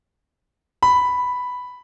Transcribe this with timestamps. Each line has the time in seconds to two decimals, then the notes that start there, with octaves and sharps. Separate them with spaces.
0.83 B5